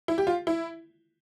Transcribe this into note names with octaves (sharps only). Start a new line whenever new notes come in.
E4
G4
F4
E4